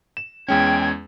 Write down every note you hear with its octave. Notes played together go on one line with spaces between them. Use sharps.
E7
E2 G#3 C#4 G5 G#6